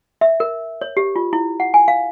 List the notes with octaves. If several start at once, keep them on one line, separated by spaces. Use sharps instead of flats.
E5
A#4
C#5
G4
F4
E4
F#5
G#5
F5